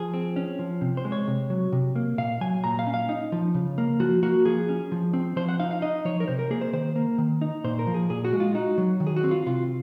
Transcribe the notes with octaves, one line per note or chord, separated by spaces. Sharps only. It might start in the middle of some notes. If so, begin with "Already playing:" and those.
Already playing: F3 G#4
C4
C#4
F3
C3
C5
G#3
C#5
C3
F#3
C3
A#3
A#2 F5
F#3 G#5
A#2 A#5
F5
C#4
F5
D#4
F3
C#3
A#3
F3 F#4
A#3 F#4
F3 G#4
C#4
F3
C4
F3 C5
F#5
D#4 F5
F5
D#4 D#5
F3 C#5
A#4
C3 C5
A#4
A#3 G#4
C5
D#3 C5
A#3
D#3
D#4
A#2 C5
A#4
F3
G#4
A#2 G#4
F#4
G#3
F4
D#4 F#4
F#3
D#3
G#4
F#4
C4
F4
C3 F4